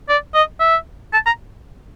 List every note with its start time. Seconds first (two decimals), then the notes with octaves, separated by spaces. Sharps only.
0.09 D5
0.35 D#5
0.60 E5
1.13 A5
1.26 A#5